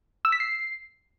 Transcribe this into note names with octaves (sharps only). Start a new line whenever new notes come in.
E6
B6
C7